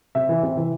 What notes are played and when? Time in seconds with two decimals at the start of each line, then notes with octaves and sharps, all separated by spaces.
0.15 C3 E5
0.29 E3
0.43 C3
0.57 E3